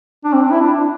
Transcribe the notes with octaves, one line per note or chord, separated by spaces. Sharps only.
D4
C4
D4
E4
D4